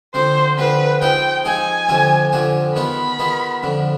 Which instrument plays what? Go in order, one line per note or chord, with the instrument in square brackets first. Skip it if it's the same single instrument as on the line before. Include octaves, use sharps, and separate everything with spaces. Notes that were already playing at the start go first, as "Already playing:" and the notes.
[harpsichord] D3 F3 C4 [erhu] C5
[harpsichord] D3 F3 C4 [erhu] B4
[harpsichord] F3 C4 D#4 G#4 [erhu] G5
[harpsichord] F3 C4 D#4 G#4 [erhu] G#5
[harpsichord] F2 D3 F3 C4 G4
F2 D3 F3 C4 G4
[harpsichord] D#3 B3 F4 G#4 [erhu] B5
[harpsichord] D#3 B3 F4 G#4
F2 D3 F3